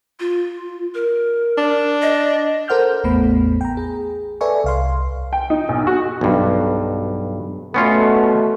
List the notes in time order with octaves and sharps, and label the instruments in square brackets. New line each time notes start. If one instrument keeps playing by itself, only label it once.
[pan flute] F4
A#4
[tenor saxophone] D4
[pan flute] D#5
[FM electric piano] A4 A#4 C5 F#5 F6 G6
A1 E2 A3 B3 B5
G5 A#5
G#4
A4 B4 D5 E5 G#5 C#6
C2 F5 C6
[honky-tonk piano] G5
D#4
B1
F#4
[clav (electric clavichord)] B1 G2
[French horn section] B2 A3 [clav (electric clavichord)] B3 C#4 F4